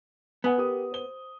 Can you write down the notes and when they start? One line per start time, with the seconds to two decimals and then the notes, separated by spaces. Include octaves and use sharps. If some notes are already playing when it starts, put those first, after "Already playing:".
0.44 B3 F#5 G#5 D#6
0.57 G4 A#4 D#6
0.92 C5 G7